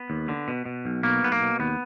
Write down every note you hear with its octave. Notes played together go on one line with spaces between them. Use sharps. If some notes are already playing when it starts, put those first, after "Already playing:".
Already playing: B3
D#2
D3
B2
B2
B1
B2 A#3
B1 B3
A#3
B2
D#2 B3